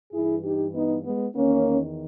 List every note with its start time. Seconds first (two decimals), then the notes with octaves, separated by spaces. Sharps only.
0.12 G2 E3 E4 G#4
0.43 D#4 G4
0.74 B3 D#4
1.05 G#3 B3
1.35 E2 D#3 A#3 C#4